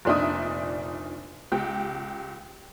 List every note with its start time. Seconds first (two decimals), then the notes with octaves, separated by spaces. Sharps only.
0.05 F1 A#2 D4 D#4 E5 D#6
1.52 C#2 G4 G5